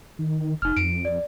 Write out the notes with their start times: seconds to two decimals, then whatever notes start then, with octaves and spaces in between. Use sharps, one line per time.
0.19 D#3
0.62 F1 D#4 F6
0.77 F2 D7
1.05 D5